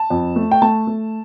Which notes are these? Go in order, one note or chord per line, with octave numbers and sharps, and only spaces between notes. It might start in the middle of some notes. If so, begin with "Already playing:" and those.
Already playing: A5
F2
A3
G5
A3 A5
A3